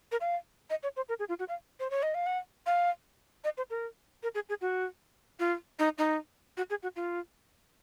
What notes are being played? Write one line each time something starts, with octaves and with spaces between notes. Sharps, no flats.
A#4
F5
D#5
C#5
C5
A#4
G#4
F4
F#4
F5
C5
C#5
D#5
F5
F#5
F5
D#5
C5
A#4
A#4
G#4
G#4
F#4
F4
D#4
D#4
F#4
G#4
F#4
F4